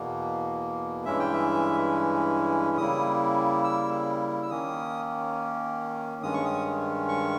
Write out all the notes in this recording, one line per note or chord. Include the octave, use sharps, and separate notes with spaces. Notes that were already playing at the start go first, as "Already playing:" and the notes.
Already playing: E2 B2 A#3
G2 E3 G#3 C#4 E4 E5
G5
E5
C#3 G3 A#3 E4 D#6
E6
E6
D#3 A#3 C#4 D#6
G2 D#3 G#3 C#4 D#6
C#6
D#6
C#6